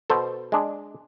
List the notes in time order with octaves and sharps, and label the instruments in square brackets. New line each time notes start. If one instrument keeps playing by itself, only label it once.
[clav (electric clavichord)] B2 A4 C5
G#3 D4